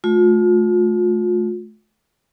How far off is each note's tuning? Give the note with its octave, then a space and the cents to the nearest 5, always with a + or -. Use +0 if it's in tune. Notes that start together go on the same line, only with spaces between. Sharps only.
A3 -30 F4 +35